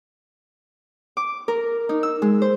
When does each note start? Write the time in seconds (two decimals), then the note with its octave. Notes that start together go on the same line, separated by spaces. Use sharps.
1.17 D6
1.48 A#4
1.89 D#4
2.03 E6
2.22 G#3
2.42 C5